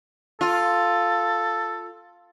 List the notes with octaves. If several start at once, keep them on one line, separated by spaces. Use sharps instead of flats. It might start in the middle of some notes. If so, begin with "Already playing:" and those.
F4 A4